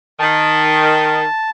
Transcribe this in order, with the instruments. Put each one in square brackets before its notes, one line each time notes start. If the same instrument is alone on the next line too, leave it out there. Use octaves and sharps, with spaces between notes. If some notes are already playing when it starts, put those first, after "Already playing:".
[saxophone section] D#3 [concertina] A5